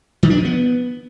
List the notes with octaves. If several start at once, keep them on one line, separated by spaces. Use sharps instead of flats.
D#3
D4
F3
B3